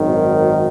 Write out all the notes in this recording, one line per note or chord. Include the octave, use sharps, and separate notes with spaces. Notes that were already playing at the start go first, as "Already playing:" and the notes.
Already playing: G#1 F#2 D#3